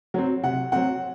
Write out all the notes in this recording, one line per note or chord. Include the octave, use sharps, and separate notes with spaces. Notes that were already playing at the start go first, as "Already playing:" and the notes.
F#3 C4
C3 F#5
F#3 C4 F#5